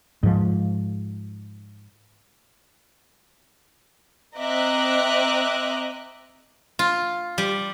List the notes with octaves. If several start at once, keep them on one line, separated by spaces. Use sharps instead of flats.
G#2 F3
C4 D#5 E5 A#5 D6 F#6
F4
G3